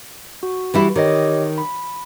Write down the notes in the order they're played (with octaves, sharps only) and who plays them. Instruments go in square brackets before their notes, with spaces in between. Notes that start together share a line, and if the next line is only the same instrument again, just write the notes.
[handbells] F#4
[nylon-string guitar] E3 G3 E4
[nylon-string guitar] D#3 [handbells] G4 C#5 D#5
[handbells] B5